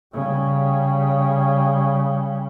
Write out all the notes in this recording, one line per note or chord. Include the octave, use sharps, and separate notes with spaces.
C#3 G3